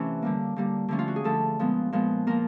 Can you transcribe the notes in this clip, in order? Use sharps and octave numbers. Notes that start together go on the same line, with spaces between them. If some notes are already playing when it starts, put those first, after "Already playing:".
Already playing: C3 E3 A3 C#4
D3 G3 A#3
D3 G3 A#3
D3 F3 A3 C#4
F4
F#4
G#4
D3 F3 A3 A4
A#2 F3 G#3 B3
A#2 F3 G#3 B3
A#2 F3 A#3 A#4